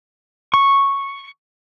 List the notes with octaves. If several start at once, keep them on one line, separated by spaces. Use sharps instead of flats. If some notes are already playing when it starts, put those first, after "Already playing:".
C#6